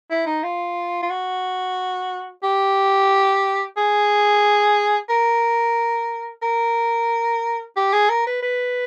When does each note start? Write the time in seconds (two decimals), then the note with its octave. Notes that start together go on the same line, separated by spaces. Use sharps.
0.10 E4
0.26 D#4
0.43 F4
1.03 F4
1.10 F#4
2.43 G4
3.77 G#4
5.09 A#4
6.42 A#4
7.76 G4
7.93 G#4
8.09 A#4
8.27 B4
8.42 B4